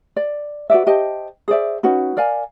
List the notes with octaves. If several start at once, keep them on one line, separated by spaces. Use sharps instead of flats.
D5
F#4 B4 D5 E5
G4 C5 D#5 A5
G#4 C5 D5 E5
C#4 D#4 F#4 B4
A#4 D5 F5 G#5